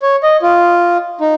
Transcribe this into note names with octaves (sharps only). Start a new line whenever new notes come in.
C#5
D#5
F4
D#4